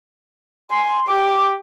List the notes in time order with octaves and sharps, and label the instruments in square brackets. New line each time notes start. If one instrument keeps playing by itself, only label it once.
[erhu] G#5 [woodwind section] C6
[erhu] G4 [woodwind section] D6